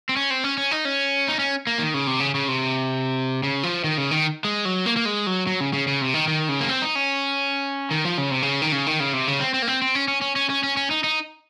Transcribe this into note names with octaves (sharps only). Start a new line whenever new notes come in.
C4
C#4
C4
C#4
C#4
D#4
C#4
D#4
C#4
A#3
D#3
C#3
C3
C#3
C#3
C3
C#3
F3
D#3
C#3
D#3
G#3
F#3
A#3
A#3
G#3
F#3
F#3
C#3
C#3
C#3
C3
D#3
D#3
C#3
A#3
C4
D#4
C#4
D#3
F3
C#3
C3
C#3
D#3
C#3
D#3
C#3
C3
C#3
C4
C4
A#3
C4
C4
C#4
C#4
C#4
C#4
C#4
C#4
C#4
D#4
D#4